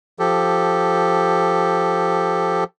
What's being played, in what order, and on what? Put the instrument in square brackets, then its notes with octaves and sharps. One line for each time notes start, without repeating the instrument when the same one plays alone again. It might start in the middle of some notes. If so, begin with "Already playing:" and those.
[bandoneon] F3 G4 A4